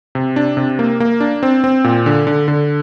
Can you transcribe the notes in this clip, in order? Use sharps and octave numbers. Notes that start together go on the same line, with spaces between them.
C3
D4
C3
A#3
A#3
D4
C4
C4
A#2
D3
D3
D3